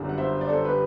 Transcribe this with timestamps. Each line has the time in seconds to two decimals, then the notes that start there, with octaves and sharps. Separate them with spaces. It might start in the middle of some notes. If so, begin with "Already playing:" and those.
Already playing: G1 F#2 D3 G3
0.09 F#5
0.18 C5 E5
0.41 D5
0.49 A4 C5
0.64 G4 B4